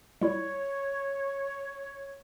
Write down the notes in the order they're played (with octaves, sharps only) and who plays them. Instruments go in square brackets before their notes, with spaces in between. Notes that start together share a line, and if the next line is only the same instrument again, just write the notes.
[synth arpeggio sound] G3 E4 [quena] C#5